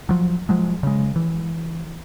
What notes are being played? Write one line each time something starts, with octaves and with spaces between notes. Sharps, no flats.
F3 F#3
F3 F#3 G#3
C#3 G#3
E3